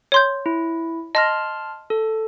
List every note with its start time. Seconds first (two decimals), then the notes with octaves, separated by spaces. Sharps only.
0.12 C#5 C6 G6
0.46 E4
1.15 D#5 A5 C6 F6 A#6
1.90 A4